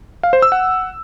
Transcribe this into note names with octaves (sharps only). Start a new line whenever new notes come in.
F5
C5
E6
F#5